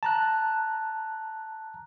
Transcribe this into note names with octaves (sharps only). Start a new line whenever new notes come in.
A5 A#5 F#6